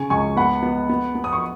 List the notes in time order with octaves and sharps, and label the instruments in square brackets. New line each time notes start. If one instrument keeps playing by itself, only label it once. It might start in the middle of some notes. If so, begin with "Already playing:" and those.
Already playing: [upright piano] C#3 G#5 C#6
C#2 G#5 C#6
B3 F#5 B5
B3
B3
B3
D#6
C#6